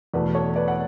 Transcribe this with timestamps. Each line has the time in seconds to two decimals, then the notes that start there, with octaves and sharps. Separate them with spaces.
0.14 E2 B2 A3 B4 D5
0.35 A4 C#5
0.56 B4 D5
0.68 F#5